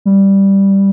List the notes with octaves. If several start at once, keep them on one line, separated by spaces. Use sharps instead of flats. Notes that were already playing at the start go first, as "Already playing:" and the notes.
G3